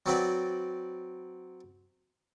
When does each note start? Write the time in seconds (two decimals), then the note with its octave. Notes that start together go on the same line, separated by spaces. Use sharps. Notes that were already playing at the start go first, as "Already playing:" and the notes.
0.06 F#3 C4 B4 D5